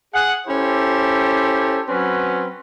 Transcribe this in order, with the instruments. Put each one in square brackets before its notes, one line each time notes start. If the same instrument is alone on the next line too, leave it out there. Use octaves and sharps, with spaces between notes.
[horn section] G#4 F#5
C#4 E4 G4 A4 C5
F#3 C4 C#4 B4